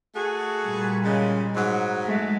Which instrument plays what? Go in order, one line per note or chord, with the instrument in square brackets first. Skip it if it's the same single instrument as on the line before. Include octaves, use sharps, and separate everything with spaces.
[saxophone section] A3 F#4 G#4
[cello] A#2 G3
[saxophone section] C#3 G#3
G#2 F#3
[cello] G#3 A3